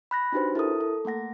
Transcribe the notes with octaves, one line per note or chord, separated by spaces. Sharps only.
B5 F#6 A#6
D4 D#4 F#4 G4 B4 C5
E4 A4 A#4 D#6
A4
A3 A#3 F#5 A#6